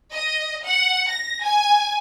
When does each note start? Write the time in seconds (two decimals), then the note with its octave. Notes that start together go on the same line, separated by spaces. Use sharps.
0.13 D#5
0.65 F#5
1.08 A#6
1.43 G#5